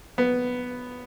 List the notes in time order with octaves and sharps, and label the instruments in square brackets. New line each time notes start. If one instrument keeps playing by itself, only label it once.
[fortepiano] B3